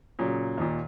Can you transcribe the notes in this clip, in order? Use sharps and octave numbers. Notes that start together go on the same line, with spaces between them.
A#2 C#3 F#3
D#2 A#2